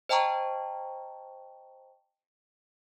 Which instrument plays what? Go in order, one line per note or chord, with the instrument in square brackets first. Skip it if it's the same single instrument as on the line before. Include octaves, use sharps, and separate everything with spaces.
[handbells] C5 D#5 G5 A5 A#5 C#6